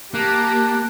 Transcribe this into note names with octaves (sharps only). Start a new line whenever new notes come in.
A#3 G4 A5 F#6